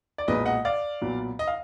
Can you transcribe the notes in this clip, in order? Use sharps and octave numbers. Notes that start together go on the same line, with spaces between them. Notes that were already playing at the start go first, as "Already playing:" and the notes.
D5
B1 A#2 G#3 B4 D#5
D#5 F#5
D5 F5
B1 A#2 F#3 B3
D#5
F5